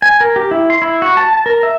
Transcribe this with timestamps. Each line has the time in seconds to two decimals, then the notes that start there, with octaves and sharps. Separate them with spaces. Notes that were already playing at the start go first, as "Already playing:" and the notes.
0.02 G#5
0.21 A#4
0.36 G4
0.51 E4
0.70 C6
0.82 E4
1.02 F#4
1.17 A5
1.33 A5
1.46 A#4
1.63 E5